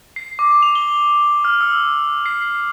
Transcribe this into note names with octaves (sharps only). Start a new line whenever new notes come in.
C7
D6
F7
G7
F6
E6
C7